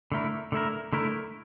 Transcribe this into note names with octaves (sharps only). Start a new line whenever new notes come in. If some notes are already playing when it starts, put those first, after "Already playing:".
D3 A3 E4 A#4
D3 A3 E4 A#4
D3 A3 E4 A#4